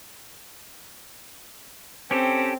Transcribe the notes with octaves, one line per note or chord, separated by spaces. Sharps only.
C4 C#4 G4 A4